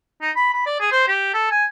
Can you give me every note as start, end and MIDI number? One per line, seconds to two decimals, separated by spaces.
0.22 0.31 63
0.36 0.49 83
0.53 0.66 83
0.66 0.78 74
0.80 0.90 68
0.92 1.03 72
1.08 1.31 67
1.34 1.49 69
1.51 1.65 80